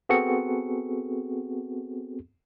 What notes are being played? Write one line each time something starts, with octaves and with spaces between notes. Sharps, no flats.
B3 C4 F#4 G#4 A4 C#7